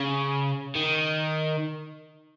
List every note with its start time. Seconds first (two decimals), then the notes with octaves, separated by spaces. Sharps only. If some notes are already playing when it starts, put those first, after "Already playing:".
Already playing: C#3
0.75 D#3